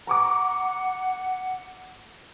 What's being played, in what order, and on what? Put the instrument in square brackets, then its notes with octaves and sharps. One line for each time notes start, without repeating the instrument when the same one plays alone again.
[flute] F#5 [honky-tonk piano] A#5 C#6 D6